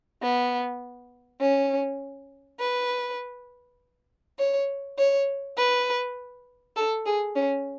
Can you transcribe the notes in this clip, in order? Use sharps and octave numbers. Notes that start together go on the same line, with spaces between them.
B3
C#4
B4
C#5
C#5
B4
A4
G#4
C#4